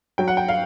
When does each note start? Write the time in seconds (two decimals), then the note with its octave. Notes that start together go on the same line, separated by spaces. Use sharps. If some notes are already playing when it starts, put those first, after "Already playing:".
0.18 F#3 G5
0.28 F#5
0.37 G5
0.48 F5